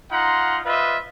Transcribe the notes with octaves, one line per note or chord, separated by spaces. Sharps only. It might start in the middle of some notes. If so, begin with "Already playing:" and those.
D#4 F4 F#5 A#5 C6
F4 B4 C5 D#5 E5